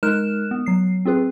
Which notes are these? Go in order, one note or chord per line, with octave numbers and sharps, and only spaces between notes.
G#3 D#4 A#4 F6 F#6 E7
B3
F#3 C7
C4 F4 G#4 B4